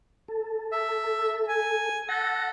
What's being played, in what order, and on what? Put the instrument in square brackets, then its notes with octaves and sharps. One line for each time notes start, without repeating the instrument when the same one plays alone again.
[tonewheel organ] A4
[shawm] E5
G#5
[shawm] A4 [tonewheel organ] F#5 A#6